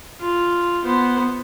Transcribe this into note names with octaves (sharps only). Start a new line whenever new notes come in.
F4
B3 C5